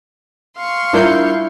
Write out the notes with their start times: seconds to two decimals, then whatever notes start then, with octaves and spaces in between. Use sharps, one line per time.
0.56 F5 C6 C#6
0.93 G3 D4 E4 F4 A#4 G6